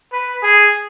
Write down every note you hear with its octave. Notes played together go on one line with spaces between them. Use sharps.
B4
G#4